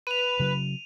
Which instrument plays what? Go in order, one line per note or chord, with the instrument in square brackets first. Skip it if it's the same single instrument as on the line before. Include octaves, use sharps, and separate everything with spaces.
[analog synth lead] B4 [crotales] D#7 F7
[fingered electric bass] C#3 F#3